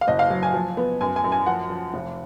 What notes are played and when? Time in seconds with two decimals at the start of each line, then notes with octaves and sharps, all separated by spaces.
0.01 F5
0.07 F#1 D#5
0.19 F5
0.30 F#3
0.43 G#5
0.54 F3
0.77 B3
1.01 F#2 G#5
1.16 G#5
1.24 F#2
1.32 G#5
1.46 F3 F#5
1.70 F3
1.94 F1